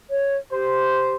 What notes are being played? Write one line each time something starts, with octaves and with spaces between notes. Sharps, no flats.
C#5
G4 C5